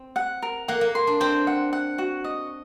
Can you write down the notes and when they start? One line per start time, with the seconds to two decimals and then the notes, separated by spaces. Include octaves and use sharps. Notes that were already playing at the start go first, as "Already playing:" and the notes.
Already playing: C4
0.16 F#5
0.43 A#4
0.68 A#3 F#5
0.81 A#3
0.95 C6
1.07 D4
1.20 C4 C5
1.47 F#5
1.73 F#5
1.98 F#4
2.24 D#5